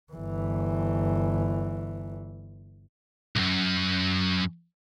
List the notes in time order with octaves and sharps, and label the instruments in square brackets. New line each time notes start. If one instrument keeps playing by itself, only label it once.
[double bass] G1 E3
[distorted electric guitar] C2 F#2